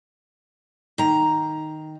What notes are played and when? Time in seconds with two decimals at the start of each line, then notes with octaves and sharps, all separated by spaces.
0.98 D#3 A#5